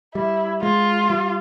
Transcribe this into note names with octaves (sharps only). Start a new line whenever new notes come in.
G3 E4
G#3 F4
G3